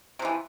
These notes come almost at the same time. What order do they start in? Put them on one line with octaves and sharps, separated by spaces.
C3 F3 E3